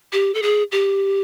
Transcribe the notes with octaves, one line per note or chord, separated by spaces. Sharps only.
G4
A4
G#4
G4